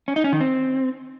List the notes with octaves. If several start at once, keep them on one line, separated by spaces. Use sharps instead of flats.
C#4
D#4
C#4
D#3
C4